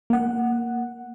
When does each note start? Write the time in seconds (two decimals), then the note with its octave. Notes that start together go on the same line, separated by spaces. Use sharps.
0.10 A#3 F#5